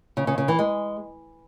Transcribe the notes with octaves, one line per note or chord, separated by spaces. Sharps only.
C#3
C#3
C#3
E3
G#3